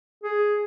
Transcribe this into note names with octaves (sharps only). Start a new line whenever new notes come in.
G#4